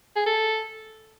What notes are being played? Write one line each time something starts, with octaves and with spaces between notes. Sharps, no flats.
G#4
A4